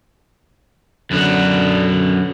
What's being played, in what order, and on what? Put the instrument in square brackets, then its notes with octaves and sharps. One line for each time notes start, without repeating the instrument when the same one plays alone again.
[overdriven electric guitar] F#2 B3 [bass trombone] D3